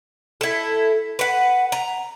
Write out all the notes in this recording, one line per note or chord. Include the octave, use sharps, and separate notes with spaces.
E4 A4
B4 F#5
A#5